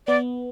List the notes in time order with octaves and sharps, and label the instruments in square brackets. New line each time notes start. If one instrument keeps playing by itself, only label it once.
[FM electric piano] B3 [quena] D5